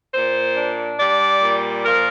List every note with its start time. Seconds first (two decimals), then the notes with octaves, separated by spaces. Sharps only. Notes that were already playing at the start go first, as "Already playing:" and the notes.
0.14 A#2 C5
0.57 D4
0.99 G3 D5
1.42 A#2
1.84 F3 A#4